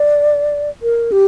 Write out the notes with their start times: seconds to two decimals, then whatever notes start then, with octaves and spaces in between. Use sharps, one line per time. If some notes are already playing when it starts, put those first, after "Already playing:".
Already playing: D5
0.82 A#4
1.12 G4